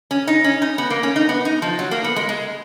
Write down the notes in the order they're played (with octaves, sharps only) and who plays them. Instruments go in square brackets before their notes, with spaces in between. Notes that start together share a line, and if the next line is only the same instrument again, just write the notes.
[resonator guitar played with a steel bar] C#4
D#4
C#4
D#4
B3
A#3
C#4
D#4
B3
D#4
F3
F#3
A#3
B3
G#3
G#3